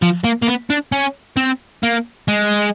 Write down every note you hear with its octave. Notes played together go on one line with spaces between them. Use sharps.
F3
A#3
A#3
B3
D4
C#4
C4
A#3
G#3